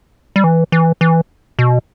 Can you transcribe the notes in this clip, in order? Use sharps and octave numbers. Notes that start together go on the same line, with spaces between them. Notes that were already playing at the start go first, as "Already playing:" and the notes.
G3
E3
E3
E3
B2